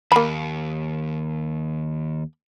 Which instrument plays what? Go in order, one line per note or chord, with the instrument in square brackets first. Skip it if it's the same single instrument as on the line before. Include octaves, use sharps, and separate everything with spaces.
[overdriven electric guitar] D#2 [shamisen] A#3 B5